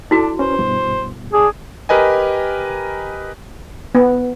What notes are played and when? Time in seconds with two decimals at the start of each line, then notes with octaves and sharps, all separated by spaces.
0.11 D4 E4 F#4 A4
0.39 C#4 B4 C5
0.59 G2 B2
1.33 D4 G#4
1.89 G4 A#4 B4 D#5 G#5
3.95 B3